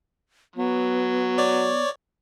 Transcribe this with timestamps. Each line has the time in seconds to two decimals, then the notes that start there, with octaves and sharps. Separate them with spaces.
0.56 F#3 B3
1.38 C#5 D5